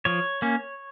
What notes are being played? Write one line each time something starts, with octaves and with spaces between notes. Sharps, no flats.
F3 C#5
A#3 C#4